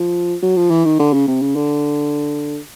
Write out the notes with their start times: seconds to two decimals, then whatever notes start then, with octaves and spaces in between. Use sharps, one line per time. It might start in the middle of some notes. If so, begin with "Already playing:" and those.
Already playing: F3
0.42 F#3
0.56 F3
0.70 E3
0.85 D#3
0.99 D3
1.13 C#3
1.27 C3
1.42 C#3
1.56 D3